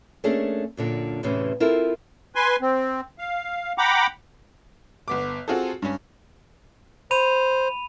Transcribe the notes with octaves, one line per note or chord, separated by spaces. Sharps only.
A3 A#3 C#4 D4 G#4
F#2 A#2 D3
E2 A2 C3 E3 C#4
C4 E4 F4 A4 A#4
B4 G#5 C6
C4
F5
F#5 G5 A#5 B5 D6
G1 B3 D6
C4 F4 F#4 G#4 A4
G2 C#4
C5 B5 D#7 F7